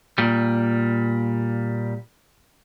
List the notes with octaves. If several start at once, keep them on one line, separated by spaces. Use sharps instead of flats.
A#2 G3